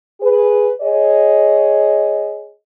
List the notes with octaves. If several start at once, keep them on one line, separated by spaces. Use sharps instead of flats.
G#4 B4
G#4 C#5 D#5